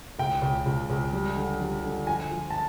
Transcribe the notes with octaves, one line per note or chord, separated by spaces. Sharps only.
C#2 G5
C#2
C#2
C#2
G3
D3
G3
D3
F3 G#5
F3
A5